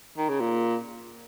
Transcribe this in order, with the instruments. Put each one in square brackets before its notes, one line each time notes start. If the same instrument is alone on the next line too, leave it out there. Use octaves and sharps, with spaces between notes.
[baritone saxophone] D#3
C#3
A#2